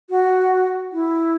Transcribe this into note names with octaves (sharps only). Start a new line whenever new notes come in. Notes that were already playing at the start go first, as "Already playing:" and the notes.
F#4
E4